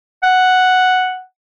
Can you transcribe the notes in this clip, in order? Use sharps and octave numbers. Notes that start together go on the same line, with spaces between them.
F#5